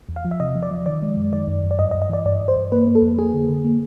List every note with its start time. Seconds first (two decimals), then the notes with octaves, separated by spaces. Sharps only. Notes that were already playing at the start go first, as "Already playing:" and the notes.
0.09 E2
0.16 F5
0.25 F3
0.31 E5
0.40 C3 D#5
0.55 F3
0.63 D5
0.71 F3
0.86 D#3 D5
1.02 G#3
1.17 F#2
1.33 D#3 D5
1.48 F#2
1.64 F#2
1.71 D5
1.79 G2 D#5
1.91 D#5
1.95 G2
2.02 D#5
2.09 E3 D5
2.25 G2 D5
2.41 G2
2.48 C5
2.56 G2
2.72 A#3 B4
2.87 A#3
2.95 A4
3.02 F2
3.18 A#3 G#4
3.34 D3
3.49 D3
3.65 A#3